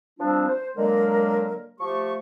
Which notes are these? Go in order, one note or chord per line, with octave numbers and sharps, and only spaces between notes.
F3 G3 C4 D4 F4
C5
D3 F#3 G#3 A#3 A#4
F3 A3 G4 C#6